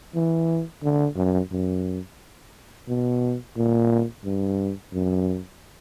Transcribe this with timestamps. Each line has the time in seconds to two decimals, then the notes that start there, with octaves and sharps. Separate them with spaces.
0.15 E3
0.83 D3
1.16 F#2
1.51 F#2
2.88 B2
3.57 A#2
4.25 G2
4.93 F#2